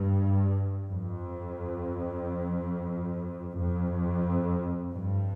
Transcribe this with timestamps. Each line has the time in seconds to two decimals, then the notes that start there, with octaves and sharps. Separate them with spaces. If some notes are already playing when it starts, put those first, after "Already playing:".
Already playing: G2
0.90 F2
3.58 F2
4.91 G2